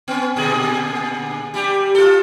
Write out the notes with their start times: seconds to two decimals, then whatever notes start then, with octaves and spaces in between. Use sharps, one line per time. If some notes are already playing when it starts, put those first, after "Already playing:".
0.08 B3 C#4
0.36 A#2 D3 G#4
1.54 G3 G4
1.95 F4 A4